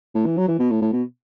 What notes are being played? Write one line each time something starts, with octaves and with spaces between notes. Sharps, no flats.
A2
E3
F#3
E3
B2
A2
A2
B2